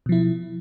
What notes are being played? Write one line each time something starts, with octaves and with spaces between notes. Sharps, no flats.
B2 F3 E4